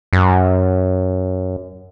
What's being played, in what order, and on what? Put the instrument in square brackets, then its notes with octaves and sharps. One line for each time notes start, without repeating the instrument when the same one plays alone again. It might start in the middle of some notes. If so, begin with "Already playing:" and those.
[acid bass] F#2